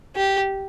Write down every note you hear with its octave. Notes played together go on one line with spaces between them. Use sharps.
G4